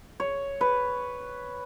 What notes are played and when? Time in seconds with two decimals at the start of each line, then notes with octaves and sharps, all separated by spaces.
0.20 C#5
0.61 B4